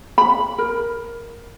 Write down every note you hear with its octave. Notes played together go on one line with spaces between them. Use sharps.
B5
A#4